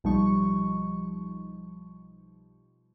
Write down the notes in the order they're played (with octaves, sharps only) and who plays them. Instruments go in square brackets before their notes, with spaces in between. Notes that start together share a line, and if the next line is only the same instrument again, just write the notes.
[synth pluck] B1 F3 G3 D#4 C#6